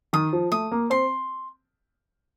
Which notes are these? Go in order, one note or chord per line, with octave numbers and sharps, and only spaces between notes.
D#3 D#6
F3
A3 D#6
A#3
C4 C6